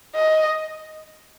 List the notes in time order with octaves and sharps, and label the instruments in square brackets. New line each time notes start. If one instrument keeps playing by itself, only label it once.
[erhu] D#5